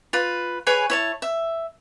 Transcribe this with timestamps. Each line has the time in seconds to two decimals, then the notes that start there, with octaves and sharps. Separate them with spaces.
0.13 F4 B4
0.67 G#4 B4 C#5 G#5
0.90 E4 C#5 A5
1.22 E5